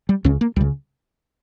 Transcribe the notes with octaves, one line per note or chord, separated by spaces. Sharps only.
G3
C#2 C#3 C#4
A#3
C#2 C#3 G3